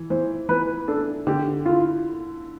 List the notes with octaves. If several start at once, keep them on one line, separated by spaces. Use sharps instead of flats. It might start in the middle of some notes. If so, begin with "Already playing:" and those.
Already playing: E3
E3 C5
E3 B4
D4 A4
D3 G4
E4 F4